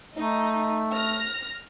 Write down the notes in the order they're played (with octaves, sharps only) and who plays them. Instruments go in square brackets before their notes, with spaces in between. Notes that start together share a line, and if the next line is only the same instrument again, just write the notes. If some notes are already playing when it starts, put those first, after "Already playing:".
[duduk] A3 [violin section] D#4
[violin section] F6 A#6